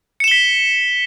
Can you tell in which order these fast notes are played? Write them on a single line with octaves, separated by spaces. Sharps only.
C#7 E7 G7 B6